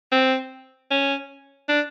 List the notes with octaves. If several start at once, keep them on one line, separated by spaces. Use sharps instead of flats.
C4
C#4
D4